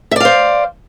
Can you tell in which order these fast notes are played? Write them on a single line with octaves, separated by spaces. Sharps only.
E5 D5 F5 C5